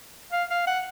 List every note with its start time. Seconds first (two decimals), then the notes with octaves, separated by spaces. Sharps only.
0.32 F5
0.50 F5
0.67 F#5